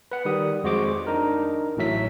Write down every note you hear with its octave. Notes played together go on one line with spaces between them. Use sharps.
B4 F#5
D#3 G3 D#6
F2 G#3 F#4 C5 D6
D4 D#4 A#4
A1 A2 F#3 E5 B6